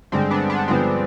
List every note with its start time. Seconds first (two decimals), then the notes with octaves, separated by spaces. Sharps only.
0.12 G2 D3 G#3 C4
0.31 B3 D4
0.50 B3 D4
0.68 G2 D3 F3 G#3 B3 C4